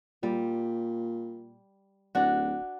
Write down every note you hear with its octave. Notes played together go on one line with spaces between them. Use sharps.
A#2 G3
D1 D4 F#4